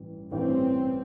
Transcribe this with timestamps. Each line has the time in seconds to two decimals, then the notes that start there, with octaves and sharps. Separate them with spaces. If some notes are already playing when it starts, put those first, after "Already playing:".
Already playing: A1 G2 E3
0.31 A1 G2 E3 C4